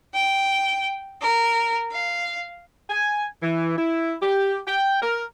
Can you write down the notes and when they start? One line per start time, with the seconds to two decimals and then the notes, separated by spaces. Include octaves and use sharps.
0.14 G5
1.22 A#4
1.93 F5
2.90 G#5
3.43 E3
3.78 E4
4.22 G4
4.68 G5
5.02 A#4